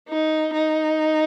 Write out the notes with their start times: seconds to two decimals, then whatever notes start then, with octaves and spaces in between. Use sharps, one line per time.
0.09 D#4
0.54 D#4